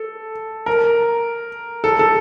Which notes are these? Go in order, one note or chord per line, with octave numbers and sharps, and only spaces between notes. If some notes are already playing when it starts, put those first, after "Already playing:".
Already playing: A4
A#4
A4
A4